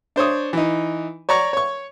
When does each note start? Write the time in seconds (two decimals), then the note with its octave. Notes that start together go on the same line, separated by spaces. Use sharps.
0.16 D4 C5 C#5 D#6
0.53 E3 D#4
1.29 C#5 D5 A#5 C#6
1.53 C#5 C#6